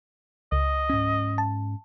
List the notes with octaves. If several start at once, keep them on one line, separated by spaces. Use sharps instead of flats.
C#2 D#5
G#2 C#4
A5